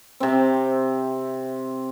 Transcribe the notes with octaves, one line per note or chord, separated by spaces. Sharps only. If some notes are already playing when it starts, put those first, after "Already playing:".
C3 C4